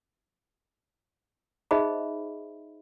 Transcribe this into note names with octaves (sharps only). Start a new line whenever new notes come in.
D#4 G#4 C5 D#5 E5 B5